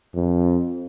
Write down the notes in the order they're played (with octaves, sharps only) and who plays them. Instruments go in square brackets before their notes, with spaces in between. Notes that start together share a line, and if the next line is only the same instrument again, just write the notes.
[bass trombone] F2